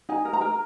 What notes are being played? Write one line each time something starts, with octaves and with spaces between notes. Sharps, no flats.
D#4 G#5
A#4
A#5
A#4